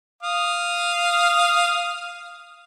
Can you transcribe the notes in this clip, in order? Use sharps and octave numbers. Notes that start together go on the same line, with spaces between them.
F5 D#6